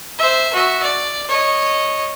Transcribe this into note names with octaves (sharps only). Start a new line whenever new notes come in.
C5 E5
F#4 E5
D5
C#5 D#5